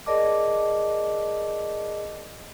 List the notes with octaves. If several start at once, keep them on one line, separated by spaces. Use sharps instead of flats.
G#4 A#4 D5 D#5 A5 D6